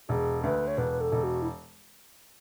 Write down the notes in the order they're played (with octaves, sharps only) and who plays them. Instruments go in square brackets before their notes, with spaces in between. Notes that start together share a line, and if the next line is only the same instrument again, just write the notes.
[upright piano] E1 [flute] G#4
[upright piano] D2 [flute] B4
[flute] C#5
[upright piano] E1 [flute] B4
[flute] A4
[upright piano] E1
[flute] F#4
E4